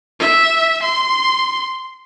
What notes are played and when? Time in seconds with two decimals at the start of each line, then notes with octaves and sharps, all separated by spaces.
0.20 E5
0.82 C6